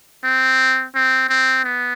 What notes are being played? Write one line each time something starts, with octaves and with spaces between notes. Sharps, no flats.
C4
C4
C4
B3